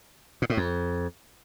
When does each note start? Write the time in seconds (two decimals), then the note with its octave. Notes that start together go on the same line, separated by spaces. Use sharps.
0.42 A#2
0.50 A2
0.57 F2